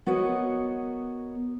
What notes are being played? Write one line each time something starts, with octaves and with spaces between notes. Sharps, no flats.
B3 F#4 A#4 C#5 D#5